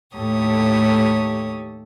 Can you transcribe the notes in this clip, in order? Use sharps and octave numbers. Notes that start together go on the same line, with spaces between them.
D#2 A2 G4 A4 C#5 D#6